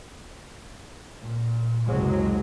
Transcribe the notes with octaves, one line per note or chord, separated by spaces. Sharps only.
A#2
F#1 C#2 C3 F#3 G#3